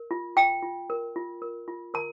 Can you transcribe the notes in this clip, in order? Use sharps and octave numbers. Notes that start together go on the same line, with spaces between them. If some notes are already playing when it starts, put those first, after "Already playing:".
Already playing: A#4
F4
F4 G5
F4
A#4
F4
A#4
F4
A#4 A#5